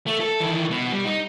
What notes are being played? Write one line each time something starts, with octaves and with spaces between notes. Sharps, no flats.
A3
A4
D#3 E3
B2
G3
D#4